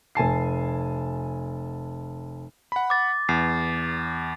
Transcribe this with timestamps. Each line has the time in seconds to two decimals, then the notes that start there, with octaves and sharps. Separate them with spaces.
0.15 F1 G#5 A5 C7
2.72 F#5 B5
2.90 D6 A6
3.29 E2 C7